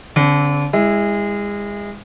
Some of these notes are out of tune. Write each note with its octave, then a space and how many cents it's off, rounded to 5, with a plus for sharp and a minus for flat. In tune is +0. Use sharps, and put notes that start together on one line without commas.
D3 -35 C4 +0
G#3 -30 E4 +0